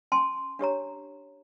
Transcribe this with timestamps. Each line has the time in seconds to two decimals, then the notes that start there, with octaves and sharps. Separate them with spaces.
0.12 C#4 G#5 A5 C6
0.59 D4 G4 C#5 A#5